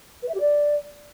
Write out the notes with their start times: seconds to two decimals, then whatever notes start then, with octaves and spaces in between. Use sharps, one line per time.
0.23 B4
0.29 E5
0.34 G4
0.40 D5